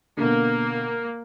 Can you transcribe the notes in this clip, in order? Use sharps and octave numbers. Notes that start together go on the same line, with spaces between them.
B2 D3 A#3